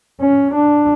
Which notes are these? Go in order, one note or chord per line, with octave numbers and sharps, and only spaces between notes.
C#4
D4